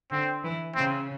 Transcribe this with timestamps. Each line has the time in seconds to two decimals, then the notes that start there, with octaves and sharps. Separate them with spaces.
0.11 D3 C4
0.43 E3
0.75 C#3 C4